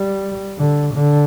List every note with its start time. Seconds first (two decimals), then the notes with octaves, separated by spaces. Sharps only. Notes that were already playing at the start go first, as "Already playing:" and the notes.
Already playing: G3
0.58 D3
0.94 D3